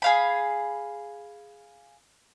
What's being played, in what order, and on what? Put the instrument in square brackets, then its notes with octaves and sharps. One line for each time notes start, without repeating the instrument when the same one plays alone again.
[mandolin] G#4 F5 B5